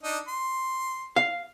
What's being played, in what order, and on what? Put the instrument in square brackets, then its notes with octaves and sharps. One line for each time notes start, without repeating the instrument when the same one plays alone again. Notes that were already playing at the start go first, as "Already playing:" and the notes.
[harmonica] D4 D#4
C6
[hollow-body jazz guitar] F5